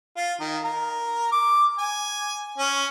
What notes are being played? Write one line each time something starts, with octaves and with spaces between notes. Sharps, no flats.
F4
D#3
A#4
D6
G#5
C#4